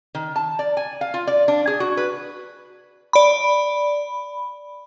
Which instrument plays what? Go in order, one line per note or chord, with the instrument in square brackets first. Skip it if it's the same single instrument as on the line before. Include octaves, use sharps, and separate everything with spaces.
[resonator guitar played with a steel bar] D#3
A5
D5
G#5
F5
F4
D5
D4
G#4
F#4
B4
[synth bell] D5 B5